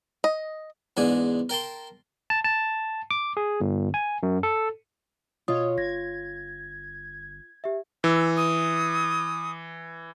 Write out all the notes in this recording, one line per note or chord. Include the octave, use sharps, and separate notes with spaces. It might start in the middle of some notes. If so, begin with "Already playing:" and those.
D#5
E2 G#2 D4 G#5
A#4 G5 A5 C6
A5
A5
D6
G#4
G1
G#5
F#2
A4
B2 F4 C#5 D#5 D#6
G1 G#6 A#6
G4 E5
E3 E6
D#6